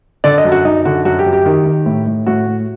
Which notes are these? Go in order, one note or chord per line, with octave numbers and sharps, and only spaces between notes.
D3 D5
D#5
F#2
F#4
F#2 D#4
D3 F#4
F#2 F#4
G4
F#2
G4
D#3
D#3
A2
A2
A2 F#4
A2